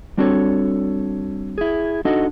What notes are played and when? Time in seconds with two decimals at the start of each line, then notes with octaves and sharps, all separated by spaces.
0.17 G3 C4 D4 F#4 A4 C#5
1.58 E4 G#4
2.05 D4 D#4 F#4 A4 D#5